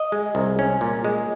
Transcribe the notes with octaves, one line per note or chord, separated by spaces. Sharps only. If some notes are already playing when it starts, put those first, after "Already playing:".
Already playing: D#5
G#3
C2
C#4
A#2
G#3